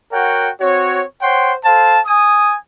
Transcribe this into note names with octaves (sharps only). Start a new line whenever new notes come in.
F#4 A#4 C#5 F#5 G5
C4 F#4 C#5
C5 C#5 F#5 G5 C6
A4 C5 F5 A5
G#5 D#6